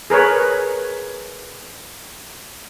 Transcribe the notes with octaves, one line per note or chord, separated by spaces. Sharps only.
G#4 A#4 B4 C#5